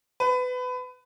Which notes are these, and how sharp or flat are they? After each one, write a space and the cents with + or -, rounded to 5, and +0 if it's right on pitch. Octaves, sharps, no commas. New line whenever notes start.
B4 +25